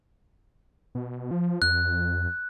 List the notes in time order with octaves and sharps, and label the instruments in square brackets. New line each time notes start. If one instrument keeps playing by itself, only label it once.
[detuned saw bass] B2
F3
[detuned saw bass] F2 [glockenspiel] F#6